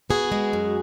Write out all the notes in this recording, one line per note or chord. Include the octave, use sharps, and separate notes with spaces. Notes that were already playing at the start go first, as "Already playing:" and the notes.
B3 F#4 G#4
G#3
F#2